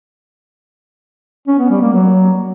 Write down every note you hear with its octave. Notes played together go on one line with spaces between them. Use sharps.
C#4
B3
G3
A#3
F#3